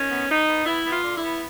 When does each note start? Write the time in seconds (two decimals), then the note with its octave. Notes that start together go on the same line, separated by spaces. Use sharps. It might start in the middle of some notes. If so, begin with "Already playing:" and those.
Already playing: D#3 C#4
0.10 B3
0.28 B3 D#4
0.46 B3
0.65 B3 E4
0.84 B3
0.91 F4
1.04 D3
1.16 E4
1.22 B3